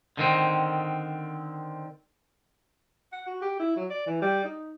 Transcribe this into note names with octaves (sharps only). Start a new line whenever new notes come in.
D3 D#3 C4
F#5
F#4
G4
E4
F#3
D5
E3
G3
D#4